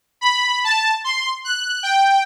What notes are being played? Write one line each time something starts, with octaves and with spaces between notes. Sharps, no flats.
B5
A5
C6
F#6
G5